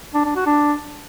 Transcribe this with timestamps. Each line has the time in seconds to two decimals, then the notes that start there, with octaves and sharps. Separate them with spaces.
0.14 D4
0.25 D4
0.36 F#4
0.46 D4